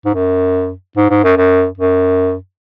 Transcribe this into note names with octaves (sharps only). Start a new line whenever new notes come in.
G#2
F#2
G#2
G#2
F#2
F#2
F#2